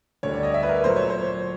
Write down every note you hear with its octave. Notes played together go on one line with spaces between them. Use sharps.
D2 D3 G3 C#5
D5
D#5
E5
B4
A#4
A#2 F#3 A3 C5
C#5
C5